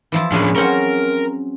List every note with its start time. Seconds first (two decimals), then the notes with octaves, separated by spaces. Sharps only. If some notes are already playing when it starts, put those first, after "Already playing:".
0.12 E3 F3 E4
0.32 A2 F3 C#4 D4 G#4 B4
0.55 F#3 C4 C#4 A#4